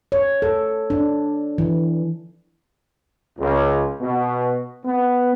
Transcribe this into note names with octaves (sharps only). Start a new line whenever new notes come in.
C#5
A4
D4
E3
C#2
B2
B3